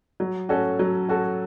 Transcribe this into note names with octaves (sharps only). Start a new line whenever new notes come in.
F#3
C#4 F#4 A4
F#3
C#4 F#4 A4